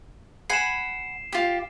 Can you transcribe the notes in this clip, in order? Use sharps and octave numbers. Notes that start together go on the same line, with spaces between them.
F#5 G#5 B5 C7 E7
F4 G4